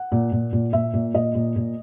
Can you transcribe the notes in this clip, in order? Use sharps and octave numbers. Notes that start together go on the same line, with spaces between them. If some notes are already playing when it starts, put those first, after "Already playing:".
Already playing: F#5
A#2
A#2
A#2
A#2 E5
A#2
A#2 D#5
A#2
A#2